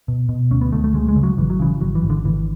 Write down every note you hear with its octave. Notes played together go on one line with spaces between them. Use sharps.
B2
B2
D2 C#4
B3
D2 A3
A3
D2 G#3
G#3
C#3
F#3
G#1 E3
F#3
C#3 E3
G#1 F#3
E3
G#1
D3
G#1 E3